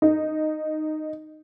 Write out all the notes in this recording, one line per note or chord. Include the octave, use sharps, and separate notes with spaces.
D#4